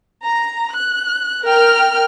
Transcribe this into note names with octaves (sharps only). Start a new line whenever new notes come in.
A#5
F#6
A#4 G5 F6